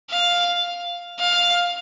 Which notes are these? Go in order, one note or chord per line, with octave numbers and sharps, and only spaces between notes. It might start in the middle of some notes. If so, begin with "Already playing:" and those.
F5
F5